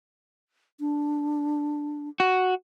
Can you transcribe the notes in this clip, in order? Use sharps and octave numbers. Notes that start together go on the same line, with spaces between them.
D4
F#4